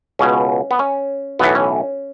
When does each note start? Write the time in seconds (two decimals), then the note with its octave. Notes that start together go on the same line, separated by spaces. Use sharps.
0.19 C#2 B2 C#4
0.71 B3
0.79 C#4
1.39 B1 A2 E3 B3
1.55 C#4